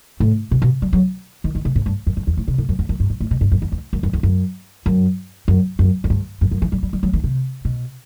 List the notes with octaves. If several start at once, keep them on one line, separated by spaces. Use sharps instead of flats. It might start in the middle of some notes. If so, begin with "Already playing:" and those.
A2
B2
B2
G3
F#3
D#3
D#3
C3
A2
G2
F#2
G2
E2
A2
C3
A2
F#2
E2
F#2
G2
G2
A2
B2
G2
F#2
E2
E2
F#2
F#2
E2
F#2
F#2
F#2
F#2
F#2
G2
F#2
F#2
E3
G3
G3
G3
F#3
D#3
C3
B2